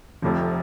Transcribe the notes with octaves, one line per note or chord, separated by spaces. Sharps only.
F1 F2 C3 F3